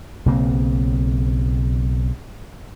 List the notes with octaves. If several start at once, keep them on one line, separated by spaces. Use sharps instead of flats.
B1 C#3 A#3 C4